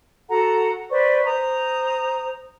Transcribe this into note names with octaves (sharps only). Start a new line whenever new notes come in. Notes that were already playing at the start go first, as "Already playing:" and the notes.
F#4 A4 F#5 A#5
B4 C5 D5 C#6
C5 A#5 D#6